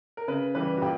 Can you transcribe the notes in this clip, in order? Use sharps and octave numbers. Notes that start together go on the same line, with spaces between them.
A#4
C#3 B4
E3 G3 B4
F#4
A#2 G4